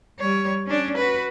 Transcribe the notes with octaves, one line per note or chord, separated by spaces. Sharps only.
G3 C#5
C#4 D4
F#4 B4